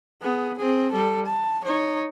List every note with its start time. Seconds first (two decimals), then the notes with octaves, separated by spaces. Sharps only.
0.22 B3 G#4
0.58 C4 G#4
0.91 G3 A4
1.26 A5
1.65 D#4 C#5